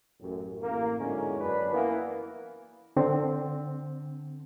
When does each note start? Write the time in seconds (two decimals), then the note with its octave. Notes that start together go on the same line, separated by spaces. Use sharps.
0.21 A1 F#2 A2
0.62 A1 A#3
0.99 E2 G#2 D3 F#3 G#3 C#4
1.40 F#2 D4 B4
1.73 E3 A#3 B3
2.97 D3 C4